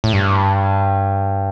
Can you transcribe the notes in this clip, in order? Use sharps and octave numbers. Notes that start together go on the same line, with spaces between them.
A2
G2